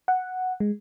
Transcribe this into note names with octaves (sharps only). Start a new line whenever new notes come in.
F#5
G#3